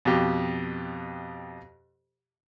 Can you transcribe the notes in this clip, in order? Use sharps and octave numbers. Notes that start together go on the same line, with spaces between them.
F2 B2 G4